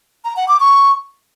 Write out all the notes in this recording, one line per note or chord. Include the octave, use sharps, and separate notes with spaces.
A#5
F#5
D6
C#6